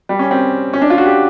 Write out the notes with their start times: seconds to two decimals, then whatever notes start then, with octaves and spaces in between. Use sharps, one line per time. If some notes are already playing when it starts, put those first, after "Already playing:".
0.09 G3
0.19 C#4
0.31 C4
0.73 C#4
0.82 D4
0.90 F4
0.98 F#4
1.06 G4